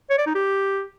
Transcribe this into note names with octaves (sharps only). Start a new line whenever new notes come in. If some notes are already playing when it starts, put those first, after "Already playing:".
C#5
D5
D#4
G4